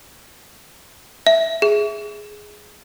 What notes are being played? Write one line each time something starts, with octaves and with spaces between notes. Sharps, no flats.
E5
G#4